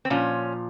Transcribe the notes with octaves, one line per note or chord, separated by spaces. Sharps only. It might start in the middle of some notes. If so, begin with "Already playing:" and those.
C4
A#2 F3 C#4